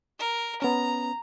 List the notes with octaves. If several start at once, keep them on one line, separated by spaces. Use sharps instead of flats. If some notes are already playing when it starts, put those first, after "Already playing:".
A#4
B3 C#4 A#5